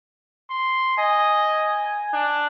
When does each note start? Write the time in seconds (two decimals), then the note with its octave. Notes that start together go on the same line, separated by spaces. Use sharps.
0.50 C6
0.98 D#5 G#5
2.13 D4